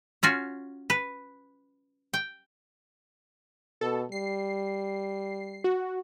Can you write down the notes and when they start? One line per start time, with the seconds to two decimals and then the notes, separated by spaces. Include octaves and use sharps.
0.23 C#4 F4 F#4
0.90 B4
2.14 G5
3.81 B2 A4
4.12 G3 C7
5.64 F#4